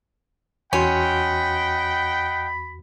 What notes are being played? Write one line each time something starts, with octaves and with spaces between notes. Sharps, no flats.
E2 C#4 F#4 D#5 F#5 G5 B5 C6